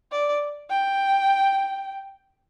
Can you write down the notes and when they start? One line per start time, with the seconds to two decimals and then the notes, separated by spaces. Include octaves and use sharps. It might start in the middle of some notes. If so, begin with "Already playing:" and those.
0.12 D5
0.69 G5